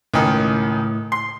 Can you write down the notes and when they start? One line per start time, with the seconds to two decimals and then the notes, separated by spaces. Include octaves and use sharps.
0.14 C#2 A2 D#3
1.12 C6